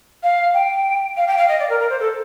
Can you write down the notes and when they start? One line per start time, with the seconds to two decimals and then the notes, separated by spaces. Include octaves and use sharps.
0.23 F5
0.54 G5
1.17 F5
1.28 G5
1.38 F5
1.48 D#5
1.59 D5
1.70 A#4
1.80 A#4
1.90 C5
2.00 A4